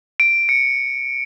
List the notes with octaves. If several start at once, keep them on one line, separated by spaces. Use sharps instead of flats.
D7
C#7